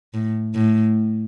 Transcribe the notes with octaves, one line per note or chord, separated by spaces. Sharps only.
A2
A2